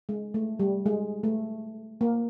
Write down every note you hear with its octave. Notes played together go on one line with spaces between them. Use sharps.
G#3
A3
G3
G#3
A3
A#3